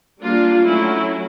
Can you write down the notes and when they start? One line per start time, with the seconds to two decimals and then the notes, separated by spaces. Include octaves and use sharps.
0.21 G3 A#3 D4 F4
0.66 F#3 A3 C#4 E4